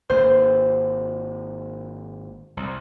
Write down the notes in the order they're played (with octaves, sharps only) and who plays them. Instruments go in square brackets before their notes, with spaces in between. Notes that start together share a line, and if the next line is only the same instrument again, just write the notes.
[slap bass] G#1 A#3 [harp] C5
[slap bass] C2